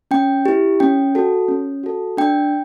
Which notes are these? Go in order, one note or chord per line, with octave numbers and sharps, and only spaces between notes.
C#4 G5
E4 G4
C#4 G5
F#4 A4
C#4
F#4 A4
D4 G5